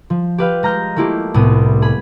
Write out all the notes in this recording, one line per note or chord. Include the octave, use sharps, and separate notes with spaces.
F3
G4 B4 F5 G5
G#3 A#5 F6 G6
A3 A#3 E4 F4 G4
C2 A2 B3 D#6
G#4 B5